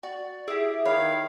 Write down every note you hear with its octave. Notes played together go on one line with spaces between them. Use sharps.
F#4 D5
E4 G4 G#4
D#3 B4 C#5 F5